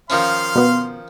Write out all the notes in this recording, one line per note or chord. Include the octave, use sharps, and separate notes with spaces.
D#3 F3 C#4 F5 C6
B2 B3